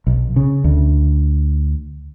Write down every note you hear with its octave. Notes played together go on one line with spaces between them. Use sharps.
B1
C#3
D2